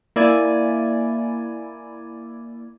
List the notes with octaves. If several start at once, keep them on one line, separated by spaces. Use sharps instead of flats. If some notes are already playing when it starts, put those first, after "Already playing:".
A#3 E4 D5 G#5